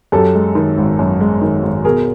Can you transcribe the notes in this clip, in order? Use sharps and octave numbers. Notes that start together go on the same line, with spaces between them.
F#2 G4 A4
G#3
D#3
G#1
F#2
G#3
D#3
G#1
B2 G#4 A#4